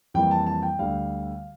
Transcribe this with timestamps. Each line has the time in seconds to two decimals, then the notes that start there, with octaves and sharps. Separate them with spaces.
0.14 F2 E3 G3 A#3 G5
0.31 A5
0.47 A5
0.63 G5
0.79 D2 D3 G3 F5